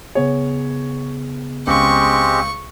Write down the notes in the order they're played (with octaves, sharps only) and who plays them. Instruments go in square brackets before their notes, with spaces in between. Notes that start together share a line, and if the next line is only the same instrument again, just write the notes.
[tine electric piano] C#3 B3 G#4 [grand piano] C#5
[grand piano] C#2 [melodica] G#3 C4 G4 [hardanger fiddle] C#6